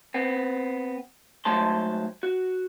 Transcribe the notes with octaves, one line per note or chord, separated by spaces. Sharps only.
B3 C4
G#2 F#3 A3 C5 A5 C6
F#4